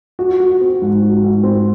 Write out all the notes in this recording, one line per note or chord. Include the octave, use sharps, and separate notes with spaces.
F#4
F#4
C4
G#2
F#4
G#2
C4